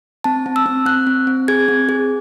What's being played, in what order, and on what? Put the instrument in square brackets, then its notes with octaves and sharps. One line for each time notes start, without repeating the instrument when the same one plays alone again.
[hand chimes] C4 A5
C4
E6
C4
C4 F#6
C4
C4
G#4 G#6
C4
G#4